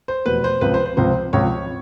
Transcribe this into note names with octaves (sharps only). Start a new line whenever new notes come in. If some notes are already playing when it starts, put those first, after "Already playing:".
C5
F1 E2 B2 B4
C5
C#2 C3 F3 B4
C5
C5
C#2 C3 F3 C5
C#2 C3 F3 C#5